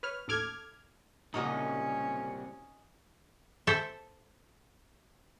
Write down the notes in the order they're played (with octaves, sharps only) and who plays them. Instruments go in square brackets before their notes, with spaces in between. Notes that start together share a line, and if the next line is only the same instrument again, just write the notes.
[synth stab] B4 C#5 F6
A1 D#2 A4 D6 F6 G#6
[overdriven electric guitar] C2 [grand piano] A#2 C#3 G#3 [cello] C#4 [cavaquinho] D#4 F#4 D#5
[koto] A4 C5 E5